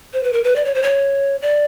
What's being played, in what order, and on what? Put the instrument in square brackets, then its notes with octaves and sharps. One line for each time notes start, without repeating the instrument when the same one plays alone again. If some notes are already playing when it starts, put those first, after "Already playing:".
[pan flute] C5
B4
A#4
B4
D5
C#5
C5
C#5
D5